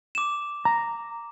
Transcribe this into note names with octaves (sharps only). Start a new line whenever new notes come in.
D6 E7
A#5